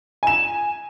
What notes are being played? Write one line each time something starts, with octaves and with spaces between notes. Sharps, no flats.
G#5 E7